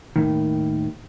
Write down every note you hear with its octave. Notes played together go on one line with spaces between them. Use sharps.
D#2 A2 D#3